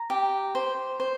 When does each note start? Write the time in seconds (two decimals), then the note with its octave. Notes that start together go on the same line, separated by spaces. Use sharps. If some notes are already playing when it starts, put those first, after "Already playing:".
Already playing: A#5
0.10 G4
0.55 C5
1.00 C5